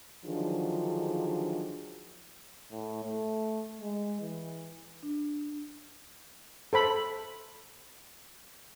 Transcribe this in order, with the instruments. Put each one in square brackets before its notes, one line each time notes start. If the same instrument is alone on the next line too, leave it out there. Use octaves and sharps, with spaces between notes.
[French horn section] D3 D#3 F3 F#3 D4 G#4
[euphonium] A2
A3
G#3
E3
[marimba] D4
[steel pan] A4 C5 B5